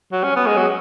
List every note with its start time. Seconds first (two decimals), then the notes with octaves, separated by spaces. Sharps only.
0.12 F#3
0.24 C#4
0.36 B3
0.47 G#3
0.57 F#3